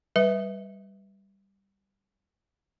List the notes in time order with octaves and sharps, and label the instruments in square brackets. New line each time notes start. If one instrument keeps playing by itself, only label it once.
[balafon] G3 B4 E5